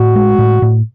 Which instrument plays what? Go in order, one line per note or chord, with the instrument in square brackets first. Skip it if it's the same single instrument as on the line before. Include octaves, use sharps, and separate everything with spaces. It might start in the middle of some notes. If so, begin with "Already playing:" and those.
Already playing: [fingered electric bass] A2 [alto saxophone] F#4
[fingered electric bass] G#3
A2
A2